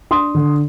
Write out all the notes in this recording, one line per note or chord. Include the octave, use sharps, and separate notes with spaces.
D4 C6 D#6
D3